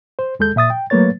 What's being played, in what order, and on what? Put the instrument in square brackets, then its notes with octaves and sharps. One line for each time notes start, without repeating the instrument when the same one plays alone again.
[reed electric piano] C5
D#2 G#3 A4 G6
A#2 E5 D#6 A6
G5
F#3 A3 A#3 B4 C#5 A6